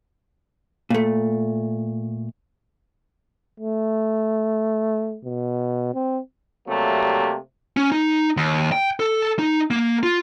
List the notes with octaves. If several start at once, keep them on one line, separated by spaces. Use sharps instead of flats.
A#2 A3
A3
B2
C4
C3 F#3 G3 A3 A#3
C#4
D#4
D#2
G5
A4
D#4
A#3
F4